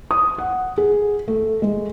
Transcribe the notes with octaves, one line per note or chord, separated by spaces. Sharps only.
D#6
F#5
G#4
A3
G#3